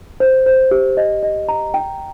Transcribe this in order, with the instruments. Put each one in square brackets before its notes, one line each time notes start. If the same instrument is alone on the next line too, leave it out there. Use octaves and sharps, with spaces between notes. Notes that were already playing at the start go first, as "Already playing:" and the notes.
[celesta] C5
C5
G4
D#5
D#5
A#5
G5